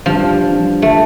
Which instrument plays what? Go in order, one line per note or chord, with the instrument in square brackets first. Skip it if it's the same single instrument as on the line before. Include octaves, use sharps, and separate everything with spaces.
[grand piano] E3 G3 D4 F4 [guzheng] F3
[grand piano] E3 G3 D4 F4
[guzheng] A3